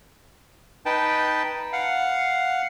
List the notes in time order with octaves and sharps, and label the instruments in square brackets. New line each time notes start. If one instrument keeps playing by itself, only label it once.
[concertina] D#4 B4 G5 A5
F5 F#5